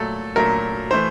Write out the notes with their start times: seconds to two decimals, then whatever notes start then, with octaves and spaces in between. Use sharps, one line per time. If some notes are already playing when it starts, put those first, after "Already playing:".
Already playing: A#2 F#3 A3 A4
0.36 A#2 F#3 A3 A#4
0.91 E3 A3 C5